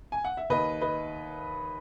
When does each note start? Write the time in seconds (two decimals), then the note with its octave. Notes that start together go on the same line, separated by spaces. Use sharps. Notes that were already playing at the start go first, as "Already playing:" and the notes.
0.12 G#5
0.24 F#5
0.37 E5
0.50 D#2 B4 D#5
0.81 B4 D#5